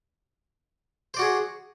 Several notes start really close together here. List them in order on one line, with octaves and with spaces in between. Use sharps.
C5 D5 F#4 G#4